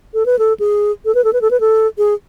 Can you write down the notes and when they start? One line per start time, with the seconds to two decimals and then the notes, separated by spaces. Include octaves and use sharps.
0.14 A4
0.26 B4
0.39 A4
0.59 G#4
1.05 A4
1.15 B4
1.24 A4
1.33 B4
1.41 A4
1.51 B4
1.60 A4
1.98 G#4